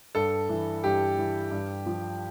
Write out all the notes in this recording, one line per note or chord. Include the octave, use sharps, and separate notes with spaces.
G2 A4
E3
G2 G4
E3
G2
F3